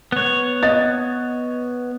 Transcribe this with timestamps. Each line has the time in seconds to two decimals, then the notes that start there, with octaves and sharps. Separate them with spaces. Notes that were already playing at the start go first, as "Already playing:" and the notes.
0.12 B3 C#5
0.63 D#5 A6